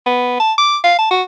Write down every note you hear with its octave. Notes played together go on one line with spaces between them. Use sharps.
B3
A5
D6
F5
A5
F#4